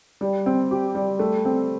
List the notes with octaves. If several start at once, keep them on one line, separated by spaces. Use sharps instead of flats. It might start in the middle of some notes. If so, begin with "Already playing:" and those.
G3
C4
G4
G3
A3
C4